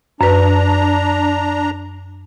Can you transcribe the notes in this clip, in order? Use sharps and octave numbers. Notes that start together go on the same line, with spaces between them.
F#2 D4 B4 A#5